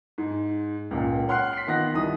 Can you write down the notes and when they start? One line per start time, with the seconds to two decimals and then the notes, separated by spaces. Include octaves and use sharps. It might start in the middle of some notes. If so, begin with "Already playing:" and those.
0.18 G#2
0.91 C#2 A#2
1.27 C#5 F#5 C6 F6 F#6 C7
1.53 B6 C7
1.67 D#3 B3 F4 F#6 A#6
1.94 C2 D#3 D#6